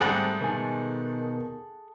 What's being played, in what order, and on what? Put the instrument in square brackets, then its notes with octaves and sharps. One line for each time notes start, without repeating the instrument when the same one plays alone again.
[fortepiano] G#2 G3 A3 [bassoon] C4 [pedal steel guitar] G#4 A4 F#5
[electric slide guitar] B2 G#5 [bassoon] D#3